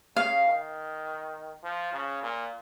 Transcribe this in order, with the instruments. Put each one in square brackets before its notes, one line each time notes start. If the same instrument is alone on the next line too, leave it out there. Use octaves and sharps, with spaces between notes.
[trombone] C#3 [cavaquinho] F5
[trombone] D#3
F3
C#3
A#2